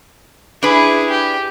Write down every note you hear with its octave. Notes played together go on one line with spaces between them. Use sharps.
D4 E4 G#4 B4
G4